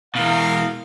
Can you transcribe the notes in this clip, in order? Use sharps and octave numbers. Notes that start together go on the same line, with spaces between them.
B2 E3 A#4 F5